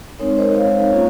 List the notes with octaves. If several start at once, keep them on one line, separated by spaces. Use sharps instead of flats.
G#3 C4 D#4 A#4 C#5
C5 D#5
C#5 F5
A#3 C#4 F4